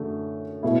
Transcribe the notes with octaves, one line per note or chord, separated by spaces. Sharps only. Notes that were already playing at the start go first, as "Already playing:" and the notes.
Already playing: F#2 D3 A3
B2 A3 E4